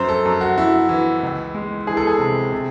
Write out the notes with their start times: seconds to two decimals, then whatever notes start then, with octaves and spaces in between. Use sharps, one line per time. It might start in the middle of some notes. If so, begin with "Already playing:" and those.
Already playing: F#2 C5
0.09 A4
0.25 F#2
0.41 F#4
0.57 F#2 E4
0.89 E3
1.23 C#2
1.54 G#3
1.87 E3 G#4
1.97 A4
2.07 G#4
2.19 C3
2.52 C3